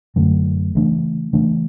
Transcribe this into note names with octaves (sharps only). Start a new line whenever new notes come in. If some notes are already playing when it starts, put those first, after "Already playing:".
F#2 D3 F#3 A3
C#3 E3 A3 D4
C#3 E3 A3 D4